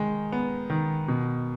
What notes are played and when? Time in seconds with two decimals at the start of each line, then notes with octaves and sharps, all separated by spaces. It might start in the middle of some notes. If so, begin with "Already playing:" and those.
Already playing: D#3 G#3
0.32 B3
0.70 D#3
1.08 B2